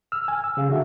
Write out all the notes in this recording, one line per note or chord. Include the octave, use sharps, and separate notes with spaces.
E6 F6
G#5
E6
C#3 G#4 F5
D3 F#4 E5